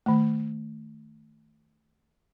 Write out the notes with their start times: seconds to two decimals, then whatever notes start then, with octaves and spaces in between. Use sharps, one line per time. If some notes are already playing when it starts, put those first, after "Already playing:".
0.06 D#3 A3